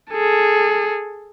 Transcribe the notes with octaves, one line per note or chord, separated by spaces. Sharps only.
G#4 A4